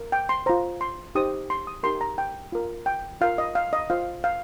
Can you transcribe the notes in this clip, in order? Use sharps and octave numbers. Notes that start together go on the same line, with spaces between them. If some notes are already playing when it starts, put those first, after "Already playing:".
Already playing: A#4
G5
C6
F4 C5 A#5
C6
D#4 G4 C5 D#6
C6
D#6
D#4 G4 A#4 C6
A#5
G5
F4 A#4
G5
F4 A#4 F5
D#5
F5
D#5
F4 C5 F5
F5